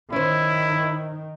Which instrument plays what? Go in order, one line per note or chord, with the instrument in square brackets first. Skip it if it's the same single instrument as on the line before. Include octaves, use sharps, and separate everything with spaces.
[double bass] D#3 [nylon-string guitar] C#4 C5 [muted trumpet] E4